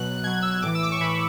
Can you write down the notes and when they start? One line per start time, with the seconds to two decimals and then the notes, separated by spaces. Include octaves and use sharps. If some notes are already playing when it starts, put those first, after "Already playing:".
Already playing: B2 F#3 F#6
0.23 B2 F#3 G#6
0.42 E6
0.62 A2 E3 D6
0.75 E6
0.83 D6
0.92 C#6
1.01 A2 E3 B5